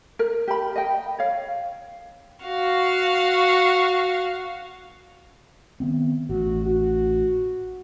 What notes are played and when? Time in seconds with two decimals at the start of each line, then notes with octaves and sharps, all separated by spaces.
0.19 A#4
0.48 G4 B5
0.76 D#5 G5
1.19 C#5 F5
2.45 F#4 F5
5.80 D#3 B3 C4
6.29 A1 F#4
6.66 F#4